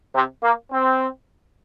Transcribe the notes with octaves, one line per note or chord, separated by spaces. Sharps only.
C3
A#3
C4